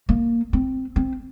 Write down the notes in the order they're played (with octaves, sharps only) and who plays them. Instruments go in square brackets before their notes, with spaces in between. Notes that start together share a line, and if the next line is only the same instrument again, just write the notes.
[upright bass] A#3
C4
C4